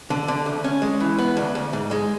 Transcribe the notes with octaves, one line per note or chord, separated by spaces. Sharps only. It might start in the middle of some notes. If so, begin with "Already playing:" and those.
D3
D3
D2
C#4
G#3
E3
B3
D2
D2
G#2
G#3